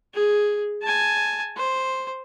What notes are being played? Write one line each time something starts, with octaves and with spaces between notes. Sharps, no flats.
G#4
G#5 A5
C5